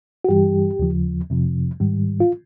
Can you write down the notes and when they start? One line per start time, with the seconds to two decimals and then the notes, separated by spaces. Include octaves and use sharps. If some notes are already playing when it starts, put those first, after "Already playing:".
0.25 F#4
0.29 G2 E3 G3 G4
0.79 D#2 C#3 F3
1.30 F2 C3 F3
1.80 G#2 D#3 G3
2.20 F4